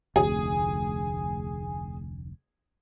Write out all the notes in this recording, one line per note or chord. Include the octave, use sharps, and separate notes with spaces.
F1 D2 G#4